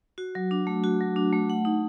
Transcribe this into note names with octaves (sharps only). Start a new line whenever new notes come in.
F#4
F#3
D4
A3
F#4
F#3
D4
A3
F#5
D#4